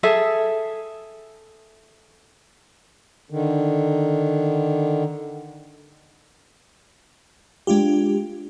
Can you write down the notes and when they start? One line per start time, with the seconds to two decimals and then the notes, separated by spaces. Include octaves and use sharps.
0.03 G#4 A4 E5
3.30 D3 D#3
7.67 G#3 D4 F4 G4